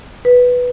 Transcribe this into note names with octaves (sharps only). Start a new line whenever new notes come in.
B4